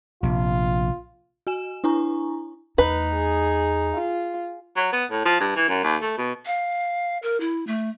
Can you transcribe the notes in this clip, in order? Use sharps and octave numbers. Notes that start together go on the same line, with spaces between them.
A#1 C3 F4
F#4 G#5 E7
D4 E4 G#5 A#5 C#6
E2 A3 D#4 B4
G#4
F4
F#3
B3
A2
F3
G2
E3
F#2
D#2
A3
B2
F5
A#4
E4
A3